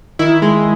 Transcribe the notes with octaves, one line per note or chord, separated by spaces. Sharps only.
D#3 E4
G#3